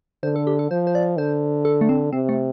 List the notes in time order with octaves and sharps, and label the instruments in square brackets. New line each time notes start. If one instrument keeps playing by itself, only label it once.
[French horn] D3 [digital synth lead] C5
[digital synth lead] A4
G4
A4
[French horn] F3 [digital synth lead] C5
[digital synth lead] C5
D5
[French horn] D3 [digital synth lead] C5
[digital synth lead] A4
A3
C4
[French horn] C3 [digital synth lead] C4
[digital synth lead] A3